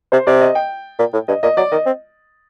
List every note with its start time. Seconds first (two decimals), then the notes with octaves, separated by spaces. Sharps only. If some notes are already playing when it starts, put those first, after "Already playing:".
0.12 C3 C5
0.27 C3 D5
0.41 D#5
0.55 G5
0.99 A#2
1.13 A2
1.28 G2 D#5
1.43 A#2 D#5
1.57 F#3 D5
1.72 D#3 D#5
1.86 C4